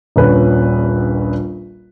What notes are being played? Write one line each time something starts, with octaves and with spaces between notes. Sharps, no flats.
D#1 A#1 C#4 B4